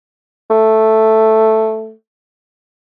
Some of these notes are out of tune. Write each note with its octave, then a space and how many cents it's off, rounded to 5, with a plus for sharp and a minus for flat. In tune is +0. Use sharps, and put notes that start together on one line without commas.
A3 +0